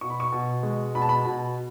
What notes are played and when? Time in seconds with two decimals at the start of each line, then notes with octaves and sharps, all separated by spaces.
0.01 B2 C#6
0.10 B5
0.20 C#6
0.32 B2
0.63 G#3
0.95 B2 B5
1.02 A5
1.09 B5
1.25 B2